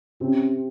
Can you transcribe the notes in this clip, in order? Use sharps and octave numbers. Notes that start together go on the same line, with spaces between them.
C3 C4 C#4